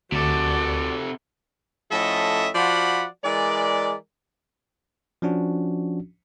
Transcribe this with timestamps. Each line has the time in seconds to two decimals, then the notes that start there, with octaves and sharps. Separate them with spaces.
0.12 D2 C3 F#4 A4 D5
1.90 A2 F3 C#4 A4 D#5 E5
2.55 F3 F4 F#4 D5 F#5 B5
3.24 E3 G#3 A#4 D5
5.22 F3 C#4 D4 F#4